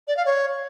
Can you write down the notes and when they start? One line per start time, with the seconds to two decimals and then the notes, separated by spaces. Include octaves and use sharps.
0.08 D5
0.17 F5
0.26 C#5